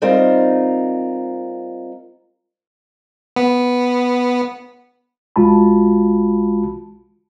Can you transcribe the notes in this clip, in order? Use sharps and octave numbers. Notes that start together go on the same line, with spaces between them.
G3 C4 D#4 F4 A#4
B3
B1 G#3 F4 F#4 A5 B5